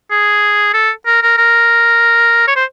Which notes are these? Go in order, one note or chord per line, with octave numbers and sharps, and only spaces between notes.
G#4
A4
A#4
A#4
A#4
C#5
C5